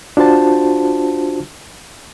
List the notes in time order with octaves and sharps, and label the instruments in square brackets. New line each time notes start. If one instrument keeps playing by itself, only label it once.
[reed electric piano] D4 F4 F#4 C5 A5